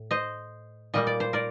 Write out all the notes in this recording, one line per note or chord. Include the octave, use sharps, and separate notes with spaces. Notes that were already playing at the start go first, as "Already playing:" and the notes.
Already playing: A2
C5 D#5
A#2 G3 A#3 D#5
D5
C5
A#4 D5